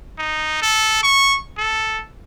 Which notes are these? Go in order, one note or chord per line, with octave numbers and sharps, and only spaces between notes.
D#4
A4
C#6
A4